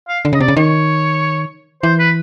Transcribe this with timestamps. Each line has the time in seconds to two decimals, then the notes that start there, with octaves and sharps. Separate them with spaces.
0.08 F5
0.25 D3
0.33 C#3 D#5
0.40 C3 D5
0.48 C#3
0.56 D#3 C#5
1.83 E3 C5
1.99 B4